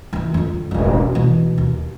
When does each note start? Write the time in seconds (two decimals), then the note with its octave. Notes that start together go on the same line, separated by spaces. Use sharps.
0.13 E3 A3
0.34 F2 D3
0.71 E1 A1
1.15 B2 E3
1.58 D#2